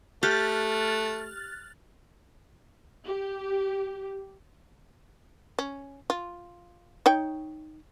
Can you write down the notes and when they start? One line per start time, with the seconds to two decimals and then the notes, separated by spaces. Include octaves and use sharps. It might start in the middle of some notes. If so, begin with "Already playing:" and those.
0.23 A3 G4 F6 F#6 A6
3.07 G4
5.59 C#4
6.10 F4
7.06 D#4 C#5 G5